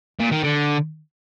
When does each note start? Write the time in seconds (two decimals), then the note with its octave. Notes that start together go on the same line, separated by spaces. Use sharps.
0.20 A#2
0.32 D#3
0.43 D3